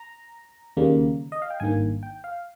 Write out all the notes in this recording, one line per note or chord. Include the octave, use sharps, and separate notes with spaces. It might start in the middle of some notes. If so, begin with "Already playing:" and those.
Already playing: A#5
D#2 C#3 G3 A#3
D#5
F5
G5
G#1 G2 D#3 A#3 G#5
G5
F5